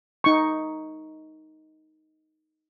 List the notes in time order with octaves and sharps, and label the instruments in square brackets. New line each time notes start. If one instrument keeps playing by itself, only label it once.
[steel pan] D#4 C#6